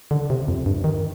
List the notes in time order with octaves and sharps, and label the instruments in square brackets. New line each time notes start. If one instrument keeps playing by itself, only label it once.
[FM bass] D3
C3
F2
G2
D#3